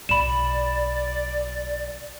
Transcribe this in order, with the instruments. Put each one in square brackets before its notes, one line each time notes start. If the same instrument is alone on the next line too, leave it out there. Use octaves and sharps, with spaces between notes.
[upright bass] B1 [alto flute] D5 [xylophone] B5 E7